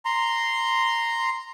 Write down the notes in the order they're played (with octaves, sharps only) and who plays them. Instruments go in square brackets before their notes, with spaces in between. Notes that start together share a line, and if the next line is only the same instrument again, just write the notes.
[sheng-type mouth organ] A#5 C6